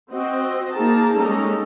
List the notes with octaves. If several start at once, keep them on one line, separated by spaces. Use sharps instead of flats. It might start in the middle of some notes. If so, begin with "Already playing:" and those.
C4 F#4 C5 D#5
A#3 D#4 G#4 A#4 A5
G3 G#3 A#3 C#4 D#4 A4